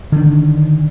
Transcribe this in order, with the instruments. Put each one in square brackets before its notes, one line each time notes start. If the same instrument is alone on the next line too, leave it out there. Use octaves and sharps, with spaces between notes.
[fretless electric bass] D3 D#3 D4